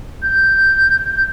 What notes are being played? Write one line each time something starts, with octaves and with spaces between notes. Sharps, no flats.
G6